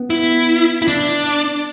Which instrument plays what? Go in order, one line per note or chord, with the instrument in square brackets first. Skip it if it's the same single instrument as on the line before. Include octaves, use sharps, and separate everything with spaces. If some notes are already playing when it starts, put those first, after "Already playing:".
Already playing: [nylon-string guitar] B3
[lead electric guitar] E4
E4
D4